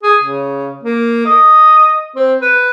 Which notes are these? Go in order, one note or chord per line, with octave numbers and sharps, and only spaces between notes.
G#4
C#3
A#3
D#5
C4
B4